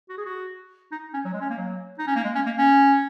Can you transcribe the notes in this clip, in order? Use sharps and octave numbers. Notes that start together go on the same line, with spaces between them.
F#4
G#4
F#4
D#4
C#4
F#3
G#3
C#4
A#3
F#3
D#4
C#4
A#3
G#3
C#4
A#3
C#4